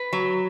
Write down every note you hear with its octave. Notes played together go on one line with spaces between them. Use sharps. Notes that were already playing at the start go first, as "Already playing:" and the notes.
Already playing: B4
F#3